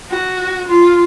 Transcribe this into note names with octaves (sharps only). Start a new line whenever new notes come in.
F#4
F4